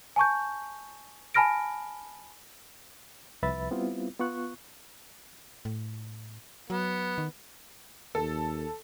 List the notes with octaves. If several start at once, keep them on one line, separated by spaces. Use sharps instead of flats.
G#5 A5 C#6 G6
G#5 A5 B5 F6 A#6 D7
C2 F3 B4 E5 B5 A6
G3 B3 C4 E4 F4
B3 F4 C#6 F#6
A2
F#3 B3
D#3
D#2 A4